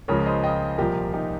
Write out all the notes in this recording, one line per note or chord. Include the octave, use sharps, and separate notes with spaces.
C#2 C#3 F3 A#4 C#5
C5 D#5
D#5 G5
C2 A#2 F3 G4 A#4
D#4 G4